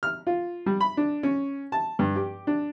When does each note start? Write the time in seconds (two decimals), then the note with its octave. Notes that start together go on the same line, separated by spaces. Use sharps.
0.03 F6
0.27 F4
0.66 G3
0.80 B5
0.97 D4
1.23 C#4
1.72 A5
1.99 G2
2.16 G4
2.47 D4